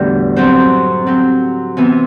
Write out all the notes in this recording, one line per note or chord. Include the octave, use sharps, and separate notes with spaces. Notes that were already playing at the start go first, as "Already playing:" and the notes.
Already playing: E2 A2 D3 G3 A3 B3 D4 F#4
F#2 F#3 C4 G4 C5
F#3 C4 G4
C3 E3 B3 E4